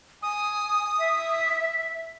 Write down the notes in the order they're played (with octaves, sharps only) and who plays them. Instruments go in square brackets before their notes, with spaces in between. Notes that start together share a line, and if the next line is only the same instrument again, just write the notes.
[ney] G#5 [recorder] D#6
[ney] E5